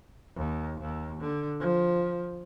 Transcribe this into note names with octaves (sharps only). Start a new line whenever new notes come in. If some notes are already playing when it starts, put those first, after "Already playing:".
D#2
D#2
D3
F3